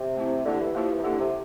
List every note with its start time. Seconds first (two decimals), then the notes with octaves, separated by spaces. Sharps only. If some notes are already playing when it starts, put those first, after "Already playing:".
Already playing: C3
0.16 A3 C4 E4
0.45 D3 A#3 E4 G4
0.60 E3
0.75 F3 A#3 E4 G4
0.89 E3
0.98 C3
1.04 D3 A#3 E4 G4
1.20 C3